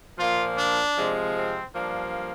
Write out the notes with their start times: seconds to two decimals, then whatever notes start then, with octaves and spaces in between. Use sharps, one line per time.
0.18 A#2 F3 A#3 F4
0.57 D4
0.96 C3 F3 G#3
1.36 C4
1.75 G2 F3 A#3 D4